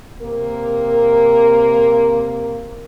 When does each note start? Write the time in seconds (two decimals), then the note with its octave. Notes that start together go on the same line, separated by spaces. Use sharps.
0.21 C3 A#3 A#4